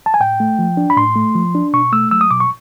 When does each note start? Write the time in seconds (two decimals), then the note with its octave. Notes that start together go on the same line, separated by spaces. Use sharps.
0.06 A5
0.14 G#5
0.20 A2 G5
0.40 A3
0.59 F3
0.77 D4
0.90 B5
0.97 A2 C6
1.16 A3
1.35 F3
1.55 D4
1.73 B2 C#6
1.92 A3 E6
2.11 F#3 E6
2.21 D#6
2.31 B2 D6
2.40 C#6